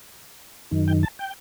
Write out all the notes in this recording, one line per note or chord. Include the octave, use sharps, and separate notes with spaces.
F#2 D#3
G5
A5
G5